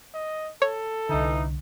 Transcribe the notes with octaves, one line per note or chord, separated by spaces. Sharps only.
D#5
A4 C#5
C2 D3 E3 D#4